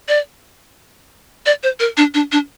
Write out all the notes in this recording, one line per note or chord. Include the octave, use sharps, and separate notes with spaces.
D5
D5
C5
A#4
D4
D4
D4